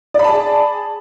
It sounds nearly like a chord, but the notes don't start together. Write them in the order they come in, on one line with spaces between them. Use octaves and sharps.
D5 B5 A5 G#4